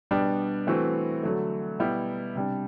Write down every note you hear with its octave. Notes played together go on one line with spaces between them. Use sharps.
B2 G3 B3 D4
E3 A3 C4 F#4
D3 F#3 A3
B2 G3 B3 E4
C3 G3 D4